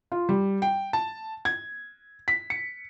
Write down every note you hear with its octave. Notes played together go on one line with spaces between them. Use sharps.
F4
G3
G5
A5
G#6
B6
C#7